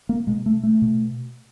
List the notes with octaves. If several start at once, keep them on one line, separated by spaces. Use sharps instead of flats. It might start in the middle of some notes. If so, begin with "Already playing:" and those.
A#3
B2 G#3
A3
A3
B2